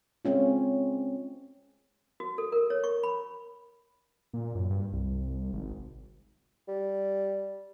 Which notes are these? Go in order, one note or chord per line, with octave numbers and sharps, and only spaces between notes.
G#3 C4 C#4 F4
F#4
A4
A#4
C#5
C#6
B5
A#2
F#2
G2
C2
G#1
G3